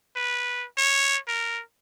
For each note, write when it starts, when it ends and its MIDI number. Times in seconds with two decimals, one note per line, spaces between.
0.16 0.66 71
0.77 1.17 73
1.28 1.62 70